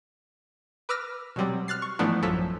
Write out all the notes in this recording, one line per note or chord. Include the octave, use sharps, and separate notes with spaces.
B4 D6 E6 F6 A#6
B2 F#3 G3 C4
F6 F#6 A6 C7
C#6
G#2 E3 F3 A3 B3 D4
A1 F#2 F3 F#3 A4 B6